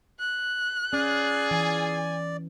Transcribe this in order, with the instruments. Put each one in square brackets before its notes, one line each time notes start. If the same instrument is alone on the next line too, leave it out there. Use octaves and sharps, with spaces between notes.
[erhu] F#6
[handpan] C#4 [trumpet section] F4 G#4 [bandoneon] D5
[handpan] E3 [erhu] G#5